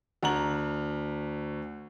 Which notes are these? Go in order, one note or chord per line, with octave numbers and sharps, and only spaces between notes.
D2 A#5 F#7